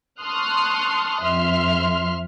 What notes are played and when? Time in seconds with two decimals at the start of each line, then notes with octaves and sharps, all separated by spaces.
0.20 A5 C6 C#6 D#6 F6 F#6
1.21 F2 E5 C6 F6